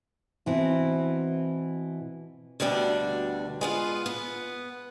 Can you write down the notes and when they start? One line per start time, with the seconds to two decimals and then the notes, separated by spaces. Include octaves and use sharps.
0.46 B2 E3 C4 D#4 E4
2.60 D2 B2 D3 G3 D4
3.61 G#3 B3 F4
4.06 B3